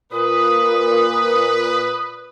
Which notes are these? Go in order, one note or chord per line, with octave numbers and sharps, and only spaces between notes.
A#2 B4 D#6